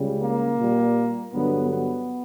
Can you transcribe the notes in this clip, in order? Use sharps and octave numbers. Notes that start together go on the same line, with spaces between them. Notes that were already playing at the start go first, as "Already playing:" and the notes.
Already playing: C#2 C#3 G3
A#3
A#2 G3
G2 D3 F#3 B3
B3